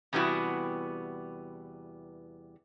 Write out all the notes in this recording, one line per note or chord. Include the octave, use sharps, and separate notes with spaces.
E2 C3 G3 B3 E4 F#4